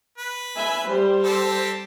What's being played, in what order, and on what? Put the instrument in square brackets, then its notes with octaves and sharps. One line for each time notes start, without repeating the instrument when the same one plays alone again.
[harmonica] B4
[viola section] E5 G#5 B5
G3 C5
[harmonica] C4 G4 A4